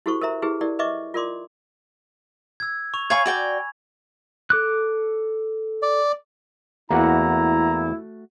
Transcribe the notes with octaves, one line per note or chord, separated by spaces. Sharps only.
E4 F#4 G4 A4 C5 C#6
A#4 C5 E5 A#5
E4 G4 G#4 B4
E4 G4 A#4 D5
B4 D#5 E5 C#6 D6
F4 A#4 D5 C6 D6
E6 G#6
C#6 F7
C#5 F5 G#5 B5 C#6 G#6
F#4 D5 G5
A4 D6 F#6
D5
E2 A3 A#3 E4 F#4 F#5 A#5